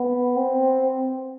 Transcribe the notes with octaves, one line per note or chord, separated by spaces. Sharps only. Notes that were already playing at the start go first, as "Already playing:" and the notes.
Already playing: B3
C4